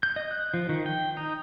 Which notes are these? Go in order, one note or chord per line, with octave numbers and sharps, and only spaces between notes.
G6
D#5
F#6
F3
D#3
G5
D#4